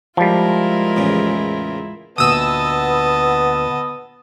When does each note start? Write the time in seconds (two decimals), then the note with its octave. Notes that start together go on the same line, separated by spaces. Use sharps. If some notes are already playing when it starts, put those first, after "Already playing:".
0.17 F3 G3 G#3 E4 F4 A#4
0.97 E2 A2 C#3
2.18 D2 A#2 B3 D#5 A5 D#6 E6